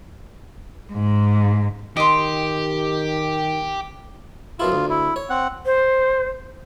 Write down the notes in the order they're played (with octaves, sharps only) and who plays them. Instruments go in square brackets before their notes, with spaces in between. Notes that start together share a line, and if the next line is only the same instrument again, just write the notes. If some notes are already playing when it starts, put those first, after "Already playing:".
[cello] G#2
[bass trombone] D#3 [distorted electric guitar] G4 [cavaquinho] D#5 C6
[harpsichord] F#2 B2 E4 [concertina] F4
[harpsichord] D2
[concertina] E4
[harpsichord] C#5
[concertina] C4 F#5
[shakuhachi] C5